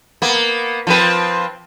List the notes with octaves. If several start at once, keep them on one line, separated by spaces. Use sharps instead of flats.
A#3 B3
F3 C4 B4